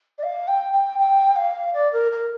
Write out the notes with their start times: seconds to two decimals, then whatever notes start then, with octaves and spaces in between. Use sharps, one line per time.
0.18 D5
0.23 F5
0.48 G5
0.73 G5
0.99 G5
1.36 F5
1.74 D5
1.93 A#4
2.12 A#4